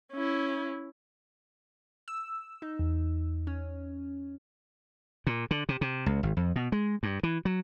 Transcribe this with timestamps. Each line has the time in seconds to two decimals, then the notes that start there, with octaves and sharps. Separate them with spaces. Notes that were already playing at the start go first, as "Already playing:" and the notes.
0.12 C#4 E4
2.08 E6
2.62 D#4
2.79 E2
3.47 C#4
5.27 A#2
5.51 D3
5.69 C3
5.81 C3
6.06 C#2
6.23 G#1
6.37 F2
6.56 B2
6.72 G#3
7.03 G2
7.23 E3
7.45 F#3